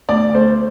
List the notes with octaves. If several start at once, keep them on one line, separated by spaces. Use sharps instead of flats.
D2 D5
A3 C5